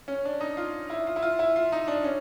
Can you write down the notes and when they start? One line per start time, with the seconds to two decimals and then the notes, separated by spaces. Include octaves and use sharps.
0.08 C#4
0.25 D4
0.41 D#4
0.57 F4
0.90 E4
1.07 F4
1.16 E4
1.22 F4
1.39 E4
1.56 F4
1.72 D#4
1.88 D4
2.04 C#4